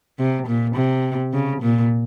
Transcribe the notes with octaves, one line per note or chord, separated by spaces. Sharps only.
C3
A#2
C3
C#3
A#2